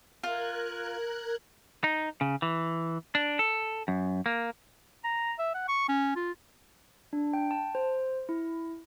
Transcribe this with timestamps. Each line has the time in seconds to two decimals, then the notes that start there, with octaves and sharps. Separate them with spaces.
0.23 F4 A#4 F#6 G#6
1.84 D#4
2.21 C#3
2.42 E3
3.15 D4
3.39 A4
3.88 F#2
4.26 A#3
5.05 A#5
5.39 E5
5.55 F#5
5.68 C#6
5.89 C#4
6.16 F4
7.13 D4
7.33 G5
7.51 A5
7.75 C5
8.29 E4